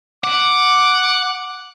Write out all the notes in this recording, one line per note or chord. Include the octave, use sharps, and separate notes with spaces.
F#5 D6